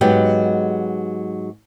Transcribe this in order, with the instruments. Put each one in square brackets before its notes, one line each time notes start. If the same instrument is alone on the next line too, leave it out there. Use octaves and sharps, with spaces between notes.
[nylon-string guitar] G#2 F#3 G#3 B3 G4